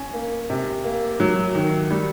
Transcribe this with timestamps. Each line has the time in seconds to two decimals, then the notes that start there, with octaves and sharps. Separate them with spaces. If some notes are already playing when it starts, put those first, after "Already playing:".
Already playing: C#4
0.14 A#3
0.50 C3
0.84 A#3
1.20 F#3
1.55 D#3
1.91 G3